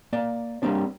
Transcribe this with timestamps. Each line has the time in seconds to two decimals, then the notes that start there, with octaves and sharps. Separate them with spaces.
0.13 A#3 D5
0.62 G3 A#3 C4 D4 C#5